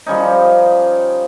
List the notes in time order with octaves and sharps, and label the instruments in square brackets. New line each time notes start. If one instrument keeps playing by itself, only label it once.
[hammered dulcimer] F3 G3 C#4 D#4